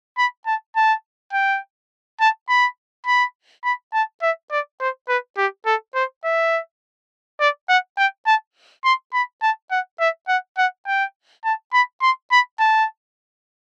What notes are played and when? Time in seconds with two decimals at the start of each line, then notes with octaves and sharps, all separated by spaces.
0.18 B5
0.46 A5
0.76 A5
1.33 G5
2.20 A5
2.49 B5
3.07 B5
3.64 B5
3.94 A5
4.22 E5
4.51 D5
4.80 C5
5.09 B4
5.38 G4
5.66 A4
5.95 C5
6.25 E5
7.40 D5
7.69 F#5
7.98 G5
8.27 A5
8.84 C6
9.14 B5
9.42 A5
9.71 F#5
10.00 E5
10.29 F#5
10.58 F#5
10.87 G5
11.45 A5
11.73 B5
12.02 C6
12.31 B5
12.60 A5